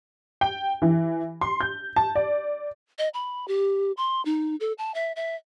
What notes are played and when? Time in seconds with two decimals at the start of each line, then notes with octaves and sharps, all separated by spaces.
0.41 G5
0.82 E3
1.41 C6
1.60 G6
1.96 A5
2.15 D5
2.98 D#5
3.14 B5
3.48 G4
3.97 C6
4.25 D#4
4.60 A4
4.78 A5
4.94 E5
5.16 E5